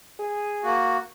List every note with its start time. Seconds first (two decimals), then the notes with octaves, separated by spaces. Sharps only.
0.20 G#4
0.64 A#3 F#4